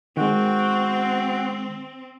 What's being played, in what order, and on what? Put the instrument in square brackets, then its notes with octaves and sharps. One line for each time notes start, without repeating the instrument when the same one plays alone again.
[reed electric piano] D#3 G#3 [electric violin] C4 [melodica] F#4 G5